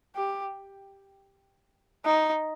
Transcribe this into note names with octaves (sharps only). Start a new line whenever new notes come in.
G4
D#4